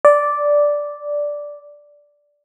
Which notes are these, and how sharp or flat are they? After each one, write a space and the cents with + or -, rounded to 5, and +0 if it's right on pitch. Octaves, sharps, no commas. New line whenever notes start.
D5 -5